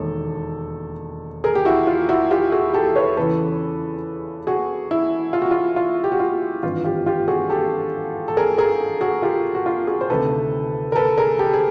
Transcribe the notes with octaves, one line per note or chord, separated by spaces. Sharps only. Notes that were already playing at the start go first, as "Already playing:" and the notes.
Already playing: E1 D#2 D#3 A4
G#4 A#4
G4
E4 F#4
F4
E4 F#4
F4 G4
F#4 G#4
G4 A4
B4 C#5
E2 C#3 E3 A4 B4
F#4 G#4
E4
F4
F#4
F4
F4
G4
F#4
F4
G#1 G2 E3 F4
F4 G4
F4 G4
F#4 G#4
G4 A4
A4
G#4 A#4
G#4 A#4
F#4 G#4
F4 G4
F#4
F4
F#4 G#4
C5
D2 C3 D#3 A4 B4
A#4
A4 B4
G#4 A#4
G4 A4
G#4